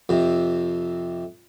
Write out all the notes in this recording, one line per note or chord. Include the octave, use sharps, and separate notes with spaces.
F2 C3